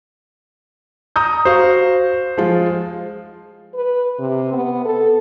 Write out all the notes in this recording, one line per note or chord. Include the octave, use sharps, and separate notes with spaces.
A#5 D#6 G6
F#4 C5 F5
F3 G#3 F4
B4
C3
B3
A4